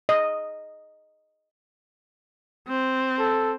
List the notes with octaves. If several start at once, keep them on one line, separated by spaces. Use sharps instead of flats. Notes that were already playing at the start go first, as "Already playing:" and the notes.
D#5
C4
A4